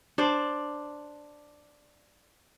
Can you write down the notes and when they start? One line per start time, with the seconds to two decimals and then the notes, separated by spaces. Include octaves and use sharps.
0.18 D4 C5 D5